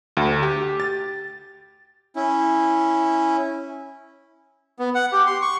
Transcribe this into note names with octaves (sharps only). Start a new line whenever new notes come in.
D2
G4
A6
C#4 E4
B3
F#5
G4
C6
C#6